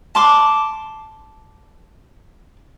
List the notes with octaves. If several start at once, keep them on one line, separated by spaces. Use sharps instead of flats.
A5 C6 D6